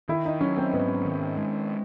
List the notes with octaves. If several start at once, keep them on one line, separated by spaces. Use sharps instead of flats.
D#3 E4
D#4
F#3 C#4
C4
G#2 B3
D#3
G#3